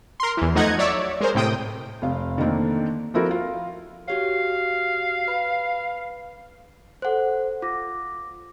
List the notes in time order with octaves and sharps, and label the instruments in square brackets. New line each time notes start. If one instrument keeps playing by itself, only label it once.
[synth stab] A#4 C6
E2 E3
F3 A3 D#4 D#5 F#5 G#6
F#3 C#5 D5 E5
G#3 A#4 C5
A2 C3 G5 D#6
[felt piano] F1 F5
D3 D#3 A3 A#3 C4 D4
F3 C4 E4 F#4 A4 A#4
F4
[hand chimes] F#4 G4 C#5 [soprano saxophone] F5
[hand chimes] B4 B5
[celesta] A4 F#6 [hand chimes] C5 F#5
[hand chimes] F4 [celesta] D6 A#6